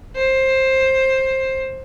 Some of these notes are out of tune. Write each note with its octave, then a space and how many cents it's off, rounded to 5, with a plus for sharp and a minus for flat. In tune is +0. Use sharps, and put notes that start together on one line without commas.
C5 +15